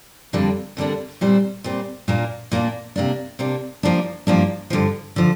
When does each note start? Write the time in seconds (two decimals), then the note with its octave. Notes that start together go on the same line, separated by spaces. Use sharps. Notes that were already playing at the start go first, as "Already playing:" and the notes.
0.33 F2 D3 G3 A#3 D4
0.77 F2 D3 G3 A#3 D4
1.21 A#2 G3 C4
1.64 A#2 G3 C4
2.08 A#2 A#3 D4
2.52 A#2 A#3 D4
2.96 C3 A#3 D4
3.39 C3 A#3 D4
3.83 G2 F3 A#3 D4
4.27 G2 F3 A#3 D4
4.70 G2 D3 F3
5.16 D3 F3